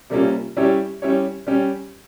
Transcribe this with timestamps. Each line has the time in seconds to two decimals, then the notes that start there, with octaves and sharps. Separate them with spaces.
0.10 C3 G3 A#3 C#4 F4
0.57 G3 C#4 E4 G4 C#5
1.02 G3 C#4 E4 G4 C#5
1.47 G3 C#4 G4